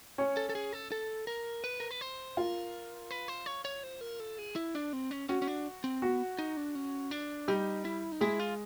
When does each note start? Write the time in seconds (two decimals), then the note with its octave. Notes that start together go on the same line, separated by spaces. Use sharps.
0.18 C#4 C#5
0.37 A4
0.49 A4
0.55 G#4
0.73 A4
0.92 A4
1.27 A#4
1.64 B4
1.80 A#4
1.91 B4
2.01 C5
2.37 F4 A#4
3.11 B4
3.28 C5
3.46 C#5
3.65 C#5
3.83 C5
4.01 A#4
4.20 A4
4.38 G#4
4.56 E4
4.75 D4
4.93 C4
5.11 C#4
5.29 C#4 F#4
5.42 C#4
5.48 D4
5.84 C4
6.02 B3 F#4
6.39 D#4
6.57 D4
6.75 C#4
7.11 D4
7.48 G3 D#4 G4
7.85 E4
8.12 D#4
8.21 G#3 E4 G#4
8.40 F4